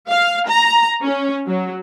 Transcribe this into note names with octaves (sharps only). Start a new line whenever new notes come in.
F5
A#5
C#4
F#3